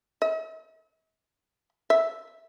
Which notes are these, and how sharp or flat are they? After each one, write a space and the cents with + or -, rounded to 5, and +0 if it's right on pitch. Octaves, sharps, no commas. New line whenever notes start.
E5 -45
E5 -5